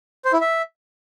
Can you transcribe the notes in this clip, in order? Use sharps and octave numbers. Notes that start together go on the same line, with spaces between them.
C5
E4
E5